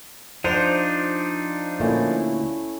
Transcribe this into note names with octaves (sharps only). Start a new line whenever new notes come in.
F3 D4 D#4 C5
D2 A#2 A3 C#4 E4